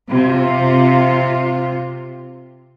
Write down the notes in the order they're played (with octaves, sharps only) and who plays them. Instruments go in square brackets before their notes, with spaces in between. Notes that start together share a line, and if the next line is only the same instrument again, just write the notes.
[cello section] C3 F4